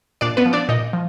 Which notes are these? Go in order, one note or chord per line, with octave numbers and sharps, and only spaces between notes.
A#2 D4 D5
B3 B4
F3
D4 D5
A#2 D#4 D#5
F3